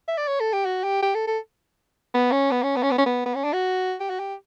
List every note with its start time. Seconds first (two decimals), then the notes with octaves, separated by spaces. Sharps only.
0.08 E5
0.17 D5
0.27 C#5
0.40 A4
0.52 G4
0.66 F#4
0.83 G4
1.02 G4
1.14 A4
1.27 A4
2.14 B3
2.32 C#4
2.51 B3
2.63 C#4
2.76 B3
2.83 C#4
2.91 B3
2.98 C#4
3.06 B3
3.26 B3
3.35 C#4
3.44 D4
3.53 F#4
4.00 G4
4.10 F#4
4.19 G4